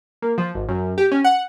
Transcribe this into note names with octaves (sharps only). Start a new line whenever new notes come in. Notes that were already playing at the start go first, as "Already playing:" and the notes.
A#3
F3
G#1
F#2
G4
C#4
F#5